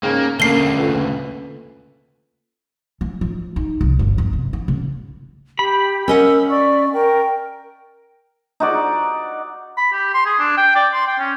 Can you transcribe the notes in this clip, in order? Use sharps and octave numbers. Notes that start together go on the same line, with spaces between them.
G#2 C#3 A#3 C#4 G#4 G5
D2 C#3 A3 A#3 C#4 C7 G7
A#3 F4 A4 B4
E3
F3
D#4
C2
G1
E2
C3
E4
C#3
G4 B5
C#4 A#4 D#5 F#5 E6
D5 C#6
A#4 G5
D#4 F#4 D5
B5
G4
C6
G#4
D4
G5
D5
C6
G5
C#4